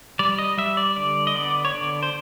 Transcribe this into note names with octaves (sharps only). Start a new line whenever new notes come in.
G3 D5
D#5
G3 E5
D5
D3 D5
D#5
B3 D5
C#5
D3 D5
C5